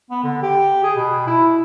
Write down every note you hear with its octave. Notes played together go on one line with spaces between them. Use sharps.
B3
D3
G4
G#4
B2
E4